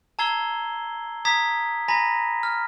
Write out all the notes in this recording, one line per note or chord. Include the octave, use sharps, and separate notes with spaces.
A5 A#5 E6 G#6 C7 G7
A#5 D#6 G#6 B6
G#5 A#5 B5 A#6 B6
F6